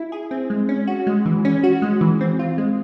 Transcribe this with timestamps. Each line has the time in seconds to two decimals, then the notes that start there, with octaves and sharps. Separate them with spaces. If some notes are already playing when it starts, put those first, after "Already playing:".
Already playing: E4
0.12 G#4
0.31 C4
0.50 G#3
0.69 C#4
0.87 F#4
1.07 G#3
1.26 E3
1.45 C#4
1.63 F#4
1.82 G#3
2.01 E3
2.21 C4
2.39 F4
2.58 G#3